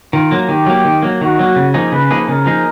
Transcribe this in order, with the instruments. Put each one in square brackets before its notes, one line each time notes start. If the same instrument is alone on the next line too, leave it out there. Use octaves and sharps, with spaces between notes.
[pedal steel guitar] D#3 [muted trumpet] F4
[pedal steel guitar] F#3 A#3
[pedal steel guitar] D#3 [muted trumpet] G4
[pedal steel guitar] F#3 A#3
D#3
F#3 A#3
[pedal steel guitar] D#3 [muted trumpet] F#4
[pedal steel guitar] F#3 A#3
C#3
F3 A#3 D#4 G#4
[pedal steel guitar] C#3 [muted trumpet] B4
[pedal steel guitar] F3 A#3 D#4 G#4
[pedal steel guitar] C#3 [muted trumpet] A#4
[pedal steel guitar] F3 A#3 D#4 G#4